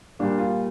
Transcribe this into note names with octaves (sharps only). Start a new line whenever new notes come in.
A#2 G3 A#3 D4
F4